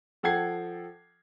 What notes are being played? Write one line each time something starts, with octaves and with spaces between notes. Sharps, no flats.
F3 A4 F#5 G5 G#6 C7